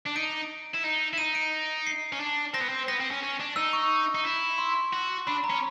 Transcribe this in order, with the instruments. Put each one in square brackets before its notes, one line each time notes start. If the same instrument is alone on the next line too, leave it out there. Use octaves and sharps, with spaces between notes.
[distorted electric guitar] D4
[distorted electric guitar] D#4 [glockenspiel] D7
[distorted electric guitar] E4
D#4
E4
[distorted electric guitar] D#4 [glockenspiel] D#7
[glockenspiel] D7
C7
[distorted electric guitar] C#4
D4
[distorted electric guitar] C4 [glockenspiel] A#6
[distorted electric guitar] B3
C4
[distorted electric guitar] B3 [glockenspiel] A#6
[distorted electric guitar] C4
C#4
C#4
D4
[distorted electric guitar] D#4 [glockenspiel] E6
[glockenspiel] C#6
[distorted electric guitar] D#4
E4
[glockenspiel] C6
[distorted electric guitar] F#4
[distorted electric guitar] D4 [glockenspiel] B5
[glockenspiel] A#5
[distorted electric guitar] C#4